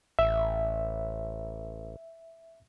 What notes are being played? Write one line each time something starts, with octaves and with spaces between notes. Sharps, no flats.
A1 E5